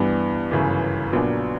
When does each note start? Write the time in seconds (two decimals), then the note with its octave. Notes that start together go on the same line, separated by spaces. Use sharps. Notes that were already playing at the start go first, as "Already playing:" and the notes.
Already playing: G2 E3 B3 D4
0.51 G1 F#2 C#3 E3
1.13 A#1 A#2 F#3 B3 D4